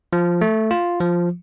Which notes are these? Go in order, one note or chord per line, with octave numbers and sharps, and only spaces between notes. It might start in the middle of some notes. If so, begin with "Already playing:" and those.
F3
A3
F4
F3